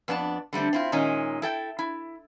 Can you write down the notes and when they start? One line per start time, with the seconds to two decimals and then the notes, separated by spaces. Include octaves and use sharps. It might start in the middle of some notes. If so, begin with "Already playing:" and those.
0.08 F2 B3 D4 E4 A5
0.53 D3 G3 A3 C4
0.73 C4 E4 F4
0.92 A#2 D#3 G#3 C#4 D#4
1.42 E4 A4 G5
1.79 E4